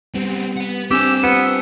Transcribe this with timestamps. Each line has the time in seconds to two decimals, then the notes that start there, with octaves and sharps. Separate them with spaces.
0.15 G3 B3 C4 G4
0.57 B4 F#5
0.91 C4 D4 G4 G#5 E6
1.23 B3 F4 G4 C5